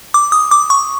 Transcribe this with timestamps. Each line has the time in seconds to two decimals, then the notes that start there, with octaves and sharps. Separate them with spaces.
0.14 D6
0.32 D#6
0.51 D6
0.70 C#6